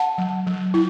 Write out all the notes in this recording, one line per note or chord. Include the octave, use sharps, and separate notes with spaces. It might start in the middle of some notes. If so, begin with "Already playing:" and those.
Already playing: F#5 A5
F#3
F#3
E4